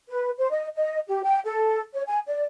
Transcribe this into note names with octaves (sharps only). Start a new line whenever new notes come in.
B4
C5
D#5
D#5
G4
G5
A4
C#5
G#5
D5